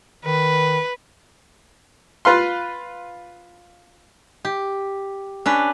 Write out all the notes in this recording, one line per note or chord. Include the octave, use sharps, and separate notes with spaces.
D#3 B4
F4 B4 F5 C6
G4
C#4 D4 B4